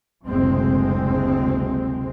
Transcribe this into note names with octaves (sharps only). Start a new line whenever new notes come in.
F#1 D2 C3 G#3 C4